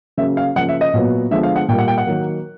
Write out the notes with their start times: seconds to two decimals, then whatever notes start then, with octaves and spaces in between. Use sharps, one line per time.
0.17 C#3 F#3 A#3 E5
0.37 F5
0.56 C#3 F3 A#3 F#5
0.69 E5
0.81 D#5
0.94 A#2 F#3 B3
1.31 D3 F3 G#3 B3 E5
1.43 F5
1.56 F#5
1.68 A#2 G3 A#3 G5
1.78 F#5
1.88 G5
1.98 F#5
2.06 D#3 F#3 A#3